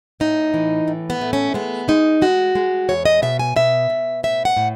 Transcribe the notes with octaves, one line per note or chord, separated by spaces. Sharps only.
A2 D#4
E3
A2
B3
A3
C#4
G#3 B3
G#3 D#4
G#3 F#4
G#3
E2 C#5
D#5
B2 E5
G#5
B2 E5
B2
A2 E5
F#5
A2